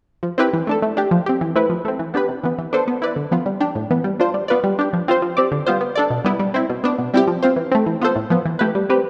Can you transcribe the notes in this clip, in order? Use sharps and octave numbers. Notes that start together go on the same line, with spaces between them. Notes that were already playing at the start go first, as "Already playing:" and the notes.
F3
C4 E4 G4 B4
E3
A3 D4 A4
A3
D4 G4
F3
C4 G4
E3
A3 C4 E4 B4
F3
A3 C4
E3
B3 D4 G4 B4
C3
E3 B3
E3
B3 D4 A4 C5
B3
E4 B4 D5
D3
F3 B3 F4
G3
D4 G4
A2
E3 B3
G3
D4 F4 C5
G3
B3 F4 B4 D5
G3
D4 G4
F3
C4 F4 C5
F3
C4 G4 D5
D3
G3 B3 F4 C5
B3
D4 A4 D5
B2
G3 B3 E4
G3
C4 E4
B2
B3 D4
B2
G3 C4 E4 G4
F3
C4 F4 C5
E3
A3 C4
E3
B3 F4 A4 C5
A2
F3 B3
E3
A3 E4 G4 B4
G3
C4 G4 B4